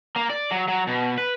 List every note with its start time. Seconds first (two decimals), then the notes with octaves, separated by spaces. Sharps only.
0.16 A#3
0.30 D5
0.51 F#3
0.68 F#3
0.87 B2
1.18 B4